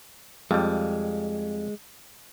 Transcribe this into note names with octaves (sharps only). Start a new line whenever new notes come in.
F2 G3 G#3